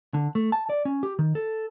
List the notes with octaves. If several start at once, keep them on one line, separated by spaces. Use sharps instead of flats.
D3
A3
A5
D5
C#4
G4
D#3
A4